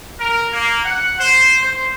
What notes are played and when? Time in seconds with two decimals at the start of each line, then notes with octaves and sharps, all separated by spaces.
0.20 A#4
0.53 A#3
0.85 F#5
1.19 C5
1.63 C5